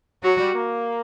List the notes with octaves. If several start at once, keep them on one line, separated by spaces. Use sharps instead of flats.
F#3 F#4
G3
A#3